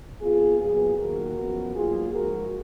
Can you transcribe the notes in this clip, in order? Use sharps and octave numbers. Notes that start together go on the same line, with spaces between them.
F2 F3 B3 F4 G#4
A#2 F#3 B3 F4 G#4
D#2 D#3 F#3 A#3 F#4 A#4
F#2 F3 B3
G#2 F#3 A#3 F4 G#4
G#2 F3 G#3 F#4 A#4